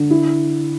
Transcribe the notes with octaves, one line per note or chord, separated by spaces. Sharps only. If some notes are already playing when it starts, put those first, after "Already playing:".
Already playing: D3
E4